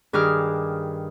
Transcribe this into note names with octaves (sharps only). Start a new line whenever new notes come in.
G2 D#3 G#4 D6 F6